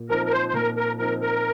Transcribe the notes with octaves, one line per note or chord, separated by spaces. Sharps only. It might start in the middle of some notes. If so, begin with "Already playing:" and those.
Already playing: A#2
F3 C4 D#4 A#4
A#4
C5
C5
A#2 A#4
A#4
F3 C4 D#4 A#4
A#4